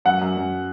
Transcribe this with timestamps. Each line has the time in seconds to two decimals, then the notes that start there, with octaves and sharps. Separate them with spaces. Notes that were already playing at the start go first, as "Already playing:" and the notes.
0.05 F#2 F#5
0.21 F#2
0.36 F#2